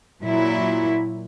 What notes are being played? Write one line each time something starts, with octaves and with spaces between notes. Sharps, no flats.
A#2 F#3 E4